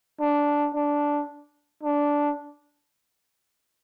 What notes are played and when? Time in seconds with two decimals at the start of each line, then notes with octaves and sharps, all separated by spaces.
0.21 D4
0.75 D4
1.83 D4